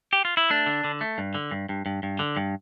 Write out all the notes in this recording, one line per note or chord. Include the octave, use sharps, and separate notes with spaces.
G4
F4
E4
A3 D4
D3
D3
A3
G2
D3
G2
G2
G2
G2
D3
G2